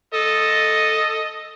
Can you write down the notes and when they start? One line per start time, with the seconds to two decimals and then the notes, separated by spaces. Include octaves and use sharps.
0.14 A4 D#5